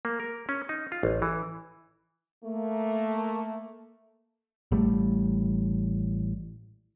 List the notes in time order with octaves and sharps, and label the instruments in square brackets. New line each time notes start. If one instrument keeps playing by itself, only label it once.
[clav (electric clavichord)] A#3
A#4
C#4
D#4
F4
A1
E3
[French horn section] A3 A#3
[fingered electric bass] A1 G3 A3